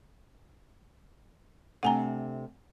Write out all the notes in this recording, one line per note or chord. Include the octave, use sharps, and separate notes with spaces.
C3 A3 D4 F#5 G#5 A#5